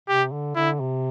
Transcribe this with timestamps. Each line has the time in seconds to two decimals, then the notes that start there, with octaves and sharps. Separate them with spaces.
0.08 C3 G4
0.32 D3
0.56 D3 E4
0.80 C3